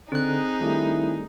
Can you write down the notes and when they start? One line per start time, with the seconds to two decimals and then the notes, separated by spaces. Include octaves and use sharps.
0.12 D3 C4 D#4 G#4 C5 F#6
0.61 D#3 G3 A3 D4 E4